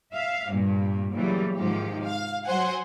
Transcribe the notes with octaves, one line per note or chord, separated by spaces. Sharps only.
E5 F5
G2 A#2
A#2 C#3 E3 F#3 G3 A3
G#2 C3 D#3 F3 G4
F5
F#3 C5 F#5 G#5